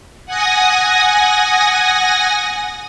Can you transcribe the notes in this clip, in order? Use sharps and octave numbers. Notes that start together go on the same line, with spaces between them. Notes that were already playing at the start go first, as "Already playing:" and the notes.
F#5 G#5 D#6 A#6